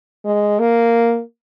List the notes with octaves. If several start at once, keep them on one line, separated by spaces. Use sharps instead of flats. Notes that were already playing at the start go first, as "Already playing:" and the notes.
G#3
A#3